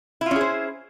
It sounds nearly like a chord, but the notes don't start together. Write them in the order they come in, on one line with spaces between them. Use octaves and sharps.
E4 F4 C#4 G#4 C5